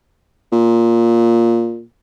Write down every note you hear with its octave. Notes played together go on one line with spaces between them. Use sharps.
A#2